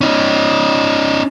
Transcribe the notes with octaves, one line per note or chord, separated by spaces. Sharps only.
C#4 D#4